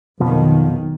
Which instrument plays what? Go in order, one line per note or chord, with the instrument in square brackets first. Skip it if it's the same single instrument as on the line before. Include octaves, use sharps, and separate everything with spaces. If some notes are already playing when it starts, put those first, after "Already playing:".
[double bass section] B1 D#3 [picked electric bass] F2 B2 F3